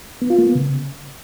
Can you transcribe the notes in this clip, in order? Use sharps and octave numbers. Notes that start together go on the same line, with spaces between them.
B3
F4
A#3
B3
C#3